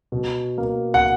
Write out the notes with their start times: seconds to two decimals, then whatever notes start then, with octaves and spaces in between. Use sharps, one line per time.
0.12 B2
0.58 A#3
0.94 F#5